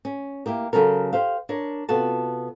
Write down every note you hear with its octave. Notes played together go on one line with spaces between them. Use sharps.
C#4
A#3 E4 G4 A#4
C#3 F#3 C#4 A4 A#4
G4 C5 F5
D4 A#4 C#5
C3 B3 F4 F#4 A4 A5